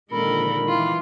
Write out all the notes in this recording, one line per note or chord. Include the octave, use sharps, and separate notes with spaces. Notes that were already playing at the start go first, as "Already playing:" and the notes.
A#2 D3 D#3 F3 G#3 A4 A#4 B5
E3 F4